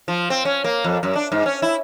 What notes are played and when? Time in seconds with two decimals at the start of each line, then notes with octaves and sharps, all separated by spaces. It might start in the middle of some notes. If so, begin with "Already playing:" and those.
0.08 F3
0.30 C4
0.45 C#4
0.64 A#3
0.84 F2
1.03 F#2
1.15 D4
1.32 G#2
1.46 C#4
1.62 E4